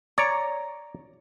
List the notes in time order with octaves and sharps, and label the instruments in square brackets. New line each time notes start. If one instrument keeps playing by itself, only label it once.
[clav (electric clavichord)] C#5 D5 [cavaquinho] A#5